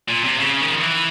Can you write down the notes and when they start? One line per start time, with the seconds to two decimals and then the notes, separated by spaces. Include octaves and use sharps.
0.08 A#2
0.24 C3
0.39 C#3
0.61 D#3
0.72 F3
0.81 E3